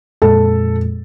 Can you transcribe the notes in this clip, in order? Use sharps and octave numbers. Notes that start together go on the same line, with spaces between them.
F2 A#2 G#3 A4